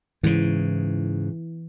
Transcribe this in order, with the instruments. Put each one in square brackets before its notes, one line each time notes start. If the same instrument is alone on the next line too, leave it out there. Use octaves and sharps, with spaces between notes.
[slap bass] G#2 C#3 [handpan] E3